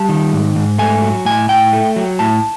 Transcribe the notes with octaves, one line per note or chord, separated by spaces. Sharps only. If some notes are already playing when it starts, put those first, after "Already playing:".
Already playing: G3 A5
D#3
G#2
G#2
A3 G#5
F#3
A2 G#5
A2 G5
A3
F#3
A2 A5